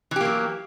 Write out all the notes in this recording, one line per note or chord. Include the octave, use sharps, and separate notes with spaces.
E3 F#3 A#3 G4